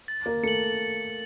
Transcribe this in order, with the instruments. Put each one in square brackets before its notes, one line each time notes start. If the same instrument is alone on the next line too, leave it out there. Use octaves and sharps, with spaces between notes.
[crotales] A6
[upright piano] A#3
[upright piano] A3 [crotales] C#7 F#7